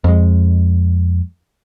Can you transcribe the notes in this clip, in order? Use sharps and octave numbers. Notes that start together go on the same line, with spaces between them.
F2 G#3